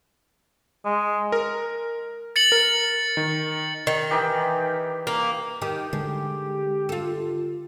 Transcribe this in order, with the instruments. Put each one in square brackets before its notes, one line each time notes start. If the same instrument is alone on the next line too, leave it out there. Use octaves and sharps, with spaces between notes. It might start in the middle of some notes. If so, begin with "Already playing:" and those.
[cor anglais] G#3
[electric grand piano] A#4
[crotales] A6 C#7 F#7
[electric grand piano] A#4
D#3
[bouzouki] D#3
[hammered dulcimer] E3 D#4 G4
[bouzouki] A#3
[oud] D#3 [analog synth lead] G4
[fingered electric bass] D3 [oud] G#3
[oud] F4 A4